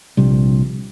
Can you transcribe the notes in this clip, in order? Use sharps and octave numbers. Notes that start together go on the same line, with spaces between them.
A#1 C3 G3